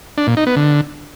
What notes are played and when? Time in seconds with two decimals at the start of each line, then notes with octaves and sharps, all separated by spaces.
0.18 D4
0.27 A#2
0.37 D#4
0.47 B3
0.56 D3